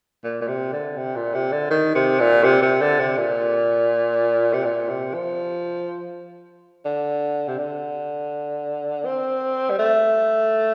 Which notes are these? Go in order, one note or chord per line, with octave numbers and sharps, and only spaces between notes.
A#2
A#2
C3
D3
C3
A#2
C3
D3
D#3
C3
A#2
C3
C3
D3
C3
A#2
C3
A#2
C3
F3
D3
C3
D3
C4
G3
A3